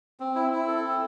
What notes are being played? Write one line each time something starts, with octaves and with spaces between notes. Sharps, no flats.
C4
E4
E4
A4
C4